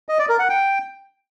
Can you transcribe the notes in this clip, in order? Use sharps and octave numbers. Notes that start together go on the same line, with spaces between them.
D#5
D5
A#4
F#5
G5